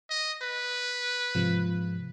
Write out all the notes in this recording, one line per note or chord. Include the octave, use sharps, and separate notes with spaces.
D#5
B4
G#2 C3 F3